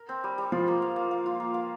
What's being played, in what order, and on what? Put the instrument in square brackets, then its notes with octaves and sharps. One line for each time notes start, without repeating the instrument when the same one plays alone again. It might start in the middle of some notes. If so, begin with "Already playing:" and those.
Already playing: [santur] A#4
C4
G3
G3
[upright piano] F3 [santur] F4
[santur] A#3
F5
A#3
F5
F4
A#3
F5